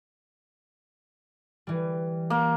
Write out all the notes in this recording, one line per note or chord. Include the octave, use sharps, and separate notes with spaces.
E3 G3
A#3